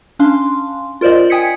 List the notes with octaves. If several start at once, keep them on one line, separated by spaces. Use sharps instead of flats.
C#4 D4 F5 C6
F4 A#4 C5 D5 D#5
G5 G#5 D#6 G#6 B6 C#7